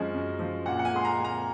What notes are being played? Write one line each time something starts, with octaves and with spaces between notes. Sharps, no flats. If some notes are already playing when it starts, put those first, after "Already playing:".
Already playing: F#2 F3 G#3 C#4 D#5
F#2
F3
A#2 F#5
F#5
G#5
G#3 C6
A#5
A#2
A#5